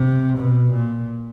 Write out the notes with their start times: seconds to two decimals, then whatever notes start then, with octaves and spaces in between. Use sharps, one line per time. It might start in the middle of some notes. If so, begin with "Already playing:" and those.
Already playing: C3
0.37 B2
0.71 A#2